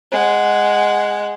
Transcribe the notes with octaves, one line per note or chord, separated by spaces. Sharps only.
G#3 F#5